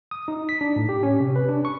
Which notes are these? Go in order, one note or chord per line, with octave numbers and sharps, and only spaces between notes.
D#6
D#4
B6
D4
A2
G4
C#4
C3
B4
D4
C#6